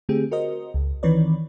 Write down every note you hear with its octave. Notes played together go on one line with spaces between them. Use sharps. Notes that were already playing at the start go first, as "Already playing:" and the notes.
D3 A3 C4 G4 G#4
F#4 A#4 C5 D#5
C#2
D#3 E3 C4 B4 C#5 D5